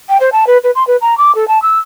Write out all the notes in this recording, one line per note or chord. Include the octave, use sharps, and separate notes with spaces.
G5
C5
A5
B4
B4
C6
B4
A#5
D6
A4
A5
E6